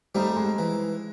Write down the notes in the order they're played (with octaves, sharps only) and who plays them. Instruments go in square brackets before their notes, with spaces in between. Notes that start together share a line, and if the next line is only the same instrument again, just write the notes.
[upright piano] G3 [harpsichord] A3 C4 D#4
[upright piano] G#3
[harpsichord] E3